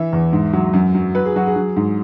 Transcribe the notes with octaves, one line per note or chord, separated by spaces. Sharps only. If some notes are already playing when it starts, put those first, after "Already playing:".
Already playing: E3 E5
E2
G#2
F#3
F#2
F#3
F#3 B4
G#4
F#3 F#4
G#4
F#3
G#2